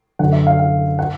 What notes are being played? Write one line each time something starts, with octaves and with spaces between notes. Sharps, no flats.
F#2 D3 F#5
E5
F5
F5
F#5